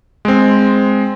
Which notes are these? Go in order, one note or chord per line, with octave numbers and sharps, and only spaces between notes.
G#3 C4